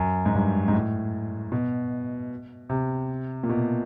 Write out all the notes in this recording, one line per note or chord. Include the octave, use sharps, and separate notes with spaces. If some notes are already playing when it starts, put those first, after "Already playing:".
Already playing: F#2
G#2
G2
G#2
A2
B2
C3
A#2
B2